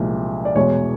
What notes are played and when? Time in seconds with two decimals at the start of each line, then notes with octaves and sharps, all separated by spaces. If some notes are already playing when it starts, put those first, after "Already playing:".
Already playing: C2 A#2 F3 G#3
0.45 D5
0.56 E2 B2 G#3 C#5